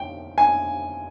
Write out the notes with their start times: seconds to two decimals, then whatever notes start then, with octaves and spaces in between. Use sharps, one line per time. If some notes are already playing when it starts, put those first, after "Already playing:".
Already playing: G5
0.38 G#5